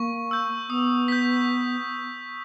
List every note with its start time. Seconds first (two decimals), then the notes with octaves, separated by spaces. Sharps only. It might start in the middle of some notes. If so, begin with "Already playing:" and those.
Already playing: A#3 C#6
0.31 E6 G6
0.69 B3 D#6
1.08 G6 B6